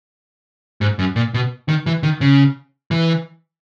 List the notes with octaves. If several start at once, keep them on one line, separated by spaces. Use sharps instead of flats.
G#2
F#2
A#2
B2
D#3
E3
D#3
C#3
E3